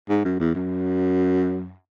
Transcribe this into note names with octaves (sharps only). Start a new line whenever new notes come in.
G#2
F#2
E2
F#2